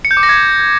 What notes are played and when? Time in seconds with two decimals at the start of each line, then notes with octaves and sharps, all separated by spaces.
0.05 C#7
0.11 G6
0.17 D6
0.23 A#6
0.29 G#6